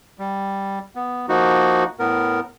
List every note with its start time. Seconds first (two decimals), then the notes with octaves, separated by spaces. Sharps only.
0.19 G3
0.95 B3
1.29 F3 A#3 D#4 F#4
1.99 A2 B3 A#4